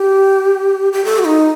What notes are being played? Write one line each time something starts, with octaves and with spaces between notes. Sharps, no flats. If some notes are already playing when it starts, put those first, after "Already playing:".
Already playing: G4
G4
A4
F#4
D#4